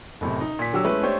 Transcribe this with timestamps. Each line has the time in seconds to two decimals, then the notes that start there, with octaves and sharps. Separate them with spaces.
0.21 F#1 A2 C3
0.41 D#4
0.59 A#2 B6
0.73 D3 F#3 G4 E6
0.85 G#3 A3 C#4 E4 B4
1.03 A3 D4 G4 C5 C#5